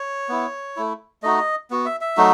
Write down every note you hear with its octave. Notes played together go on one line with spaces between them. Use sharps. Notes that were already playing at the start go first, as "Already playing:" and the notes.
Already playing: C#5
B3 E4
A3 E4
A3 D#4 F#4 D#5
B3 F#4
E5
E5
F#3 A3 D#4 F#4